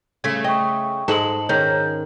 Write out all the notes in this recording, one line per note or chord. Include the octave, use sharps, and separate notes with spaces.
C#3 A3 G#6 B6
D#5 G5 C#6
G#2 G#3 A4 A5 F#7
D#3 C#4 G#4 F6 G6